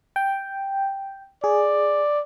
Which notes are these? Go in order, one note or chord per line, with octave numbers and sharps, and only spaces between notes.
G5
G#4 D5